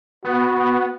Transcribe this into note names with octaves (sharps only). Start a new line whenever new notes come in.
B3 F#4